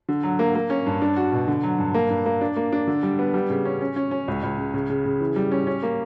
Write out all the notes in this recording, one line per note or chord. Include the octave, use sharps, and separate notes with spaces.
D3
F#3
A#3
A#3
C#4
G2
D4
F#4
B2
D3
F#3
G2
A#3
G2
A#3
D4
A#3
D4
D3
G3
B3
G3
C#3
C#4
C#4
C#4
C#4
C#2
C#2
C#3
C#3
C#3
C#3
E3
G3
C#4
C#4
A#3